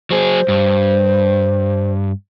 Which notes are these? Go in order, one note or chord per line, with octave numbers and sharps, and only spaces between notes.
F#3 G#4 C5
G2